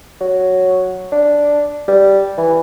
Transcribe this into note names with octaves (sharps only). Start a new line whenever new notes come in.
F#3
D4
G3
E3